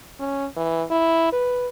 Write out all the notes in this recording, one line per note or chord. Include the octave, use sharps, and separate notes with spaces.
C#4
E3
E4
B4